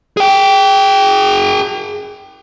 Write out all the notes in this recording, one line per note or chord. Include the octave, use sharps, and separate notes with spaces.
G#4 G5